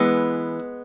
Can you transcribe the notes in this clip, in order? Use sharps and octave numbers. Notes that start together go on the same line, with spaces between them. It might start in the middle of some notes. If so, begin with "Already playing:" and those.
Already playing: E3 G#3 B3